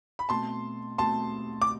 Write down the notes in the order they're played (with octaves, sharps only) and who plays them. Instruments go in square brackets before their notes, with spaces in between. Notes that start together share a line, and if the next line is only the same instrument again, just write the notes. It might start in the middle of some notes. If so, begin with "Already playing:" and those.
[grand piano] B5
[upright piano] B2 A3 C4 [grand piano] A5 C6
[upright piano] B2 A3 C4 [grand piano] A5 C6
[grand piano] D6